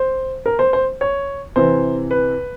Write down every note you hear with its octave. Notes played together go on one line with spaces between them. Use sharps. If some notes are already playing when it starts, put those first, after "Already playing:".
Already playing: C5
A#4
C5
C5
C#5
C3 E3 C5
B4